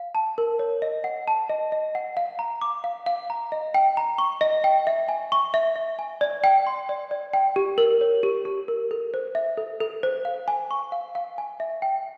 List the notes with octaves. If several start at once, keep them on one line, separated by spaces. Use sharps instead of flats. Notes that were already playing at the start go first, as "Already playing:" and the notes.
Already playing: F5
A5
A#4
C#5
D#5
F#5
A5
D#5
D#5
F#5
F5
A#5
D6
F5
F5
A#5
D#5
G5
A#5
C#6
D#5
G5
E5
G#5
C#6
E5
E5
G#5
D5
G5
C6
D5
D5
G5
G4
A#4
C#5
G4
G4
A#4
A4
C5
E5
A4
A4
C5
F5
G#5
C#6
F5
F5
G#5
E5
G5